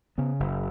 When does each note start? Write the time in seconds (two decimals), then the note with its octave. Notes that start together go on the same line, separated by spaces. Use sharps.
0.18 C#3 B3
0.40 F#1